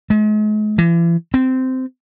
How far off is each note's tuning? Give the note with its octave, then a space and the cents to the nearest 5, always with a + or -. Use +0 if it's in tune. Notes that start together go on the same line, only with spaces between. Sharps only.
G#3 +40
E3 +40
C4 -15